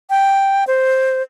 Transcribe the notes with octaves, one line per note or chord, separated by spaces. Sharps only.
G5
C5